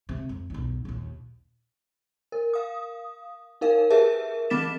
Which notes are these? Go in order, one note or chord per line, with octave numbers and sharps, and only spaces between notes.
C3
F2
B1 E2
A#1 D#2
A#4
F5 D#6
D#4 A#4 F5
G4 G#4 A#4 B4 E5 A5
E3 C4 D6 A6 B6 E7